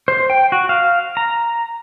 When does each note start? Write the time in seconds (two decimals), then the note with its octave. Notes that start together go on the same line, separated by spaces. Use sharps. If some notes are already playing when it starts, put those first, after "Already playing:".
0.08 C5
0.30 G5
0.52 F#4
0.69 F5
1.17 A#5